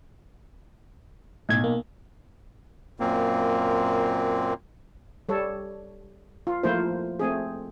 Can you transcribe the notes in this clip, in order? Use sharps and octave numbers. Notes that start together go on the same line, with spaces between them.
B1 A2 G#6
A#3
F#2 A#2 A#3 C4
G3 A4 C#5
F4
F3 A3 A#3 E4 F4 C5
A3 C4 G#4